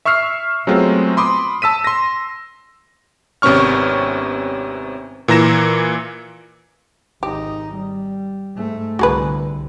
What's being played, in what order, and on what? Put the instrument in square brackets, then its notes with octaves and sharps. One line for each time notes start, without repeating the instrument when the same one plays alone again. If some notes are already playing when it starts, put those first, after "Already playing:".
[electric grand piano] E5 C#6 E6 F6 C7
F#3 G#3 A3 B3 C4 F4
B5 C6 D6 D#6
A5 E6 B6 D#7
C6 A#6
G#1 C3 B3 C#4 C#6 F6
A#2 E3 A#5 A#6 E7
[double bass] G#1 D#4 [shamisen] G4
[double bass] G3
G#2 A3
[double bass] C2 D3 [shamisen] F#4 G#4 B4